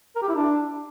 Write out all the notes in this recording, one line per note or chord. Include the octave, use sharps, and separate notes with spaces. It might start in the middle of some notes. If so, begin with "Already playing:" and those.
A#4
G4
E4
D4